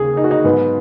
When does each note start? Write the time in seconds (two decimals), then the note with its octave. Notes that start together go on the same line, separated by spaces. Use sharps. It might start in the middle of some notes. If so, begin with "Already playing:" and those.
Already playing: D#2 C#3 G#4
0.17 D#4
0.24 F#4
0.31 D#4
0.44 G#2 F#3 B3